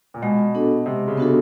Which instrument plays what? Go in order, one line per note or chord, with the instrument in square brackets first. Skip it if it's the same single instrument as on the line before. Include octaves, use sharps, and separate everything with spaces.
[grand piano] A#2
[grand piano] B2 [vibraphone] G#3
[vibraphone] B3 D4 F#4 A4
[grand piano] C3 [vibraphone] G#3
[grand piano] C#3
[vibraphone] B3 D4 F#4 A4